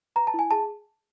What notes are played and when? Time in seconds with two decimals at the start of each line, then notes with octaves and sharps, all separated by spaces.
0.16 B4 A#5
0.27 A5
0.34 E4 G#5
0.51 G#4 A5